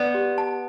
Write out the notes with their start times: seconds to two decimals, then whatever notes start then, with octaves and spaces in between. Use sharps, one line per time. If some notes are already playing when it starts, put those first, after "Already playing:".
Already playing: B3 D5
0.14 G4
0.38 A5